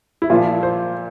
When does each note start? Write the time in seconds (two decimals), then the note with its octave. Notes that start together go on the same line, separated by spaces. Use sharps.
0.22 E4
0.30 A#2 F3 F4
0.63 C5